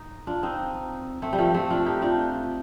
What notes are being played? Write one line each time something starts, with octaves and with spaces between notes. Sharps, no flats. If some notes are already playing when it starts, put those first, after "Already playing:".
Already playing: D#4
D4 F4
C4 D#4
A3 C4
G3
F3 A3
A3 C4
D4 F4
D#4 G4
D4 F4